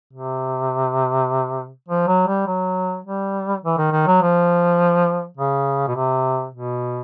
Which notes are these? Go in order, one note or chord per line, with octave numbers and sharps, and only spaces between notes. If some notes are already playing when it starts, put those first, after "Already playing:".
C3
F3
F#3
G3
F#3
G3
E3
D#3
D#3
F#3
F3
C#3
B2
C3
B2